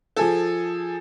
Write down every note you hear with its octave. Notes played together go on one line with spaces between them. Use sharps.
F3 G#4 A4